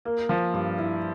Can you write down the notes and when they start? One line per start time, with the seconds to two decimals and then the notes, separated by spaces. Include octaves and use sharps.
0.05 A#3
0.29 F3
0.54 G2
0.78 E4